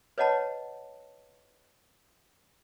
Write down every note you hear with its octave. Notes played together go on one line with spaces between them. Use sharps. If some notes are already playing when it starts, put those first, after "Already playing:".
B4 C#5 D#5 F#5 A5 B5